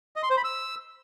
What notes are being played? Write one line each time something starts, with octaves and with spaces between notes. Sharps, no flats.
D#5
C6
C5
B5
E6